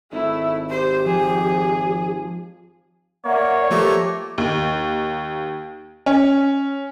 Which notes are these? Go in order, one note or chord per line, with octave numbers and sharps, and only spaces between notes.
G#1 A3 E4
G4 C5
F3 G#4
A#3 C#5 D5 E5 F#5
F3 A3 A#3 G4 A#5 D6
D#2
C#4